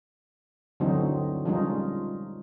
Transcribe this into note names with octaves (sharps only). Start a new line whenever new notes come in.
D3 E3 F#3 C4 D#4
F3 G3 G#3 C#4 D#4 F4